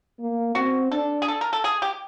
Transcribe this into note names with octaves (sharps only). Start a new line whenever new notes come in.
A#3
C4 F#4
D4 A4
G#4
A4
A#4
A4
G#4
G4